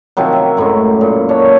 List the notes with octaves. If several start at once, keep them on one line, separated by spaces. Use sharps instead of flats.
C3 D#3 F3 F#3
E5
F#2 A2 F#3 G#3
A#2
D4 C#5